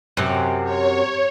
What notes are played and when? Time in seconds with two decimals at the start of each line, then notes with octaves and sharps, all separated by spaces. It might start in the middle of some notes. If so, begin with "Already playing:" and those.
0.17 F#2 C3
0.64 C#5